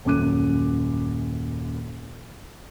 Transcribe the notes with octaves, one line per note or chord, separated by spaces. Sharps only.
D#1 F#2 C#4 D6 F#6 D#7